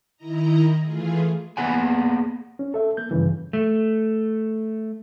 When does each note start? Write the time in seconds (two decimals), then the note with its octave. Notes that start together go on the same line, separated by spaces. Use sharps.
0.17 D#3 E4 D#5 A#5
0.82 E3 A3 F4 G#4
1.57 A#3 B3 G#4 F#5 G#5
2.59 C#4
2.74 A4 E5
2.97 A#3 G6
3.11 G2 C#3 E3
3.53 A3